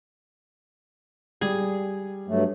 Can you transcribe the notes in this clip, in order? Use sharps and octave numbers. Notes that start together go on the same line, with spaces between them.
G3 G#4
G2 F#3 A3